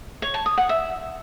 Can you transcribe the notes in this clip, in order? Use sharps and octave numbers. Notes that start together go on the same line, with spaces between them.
C#5
A5
D#6
F#5
E5